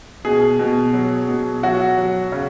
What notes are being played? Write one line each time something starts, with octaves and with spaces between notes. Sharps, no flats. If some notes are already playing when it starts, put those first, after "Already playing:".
B2 G#4
B2
F#3
B2
F#3 F#4
F#3
C#3